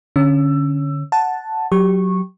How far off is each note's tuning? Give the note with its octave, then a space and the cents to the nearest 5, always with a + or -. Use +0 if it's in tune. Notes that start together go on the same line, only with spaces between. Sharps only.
D3 +0 C#4 +0 E6 +15
F#5 +0 A5 +0
F#3 +0 G4 +0 C#6 -15